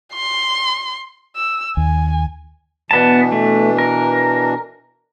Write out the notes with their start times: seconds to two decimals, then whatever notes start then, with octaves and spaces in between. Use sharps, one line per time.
0.13 C6
1.36 E6
1.77 D#2 G#5
2.91 B2 E3 B3 D4 A5
3.32 A3
3.78 A#4